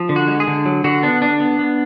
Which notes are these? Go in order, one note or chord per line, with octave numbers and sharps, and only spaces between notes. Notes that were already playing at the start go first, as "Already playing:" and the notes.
Already playing: F3
D3
F#4
G#3
G#4
D3
F#3
D3 F#4
B3 D4
D3 D4
B3
B3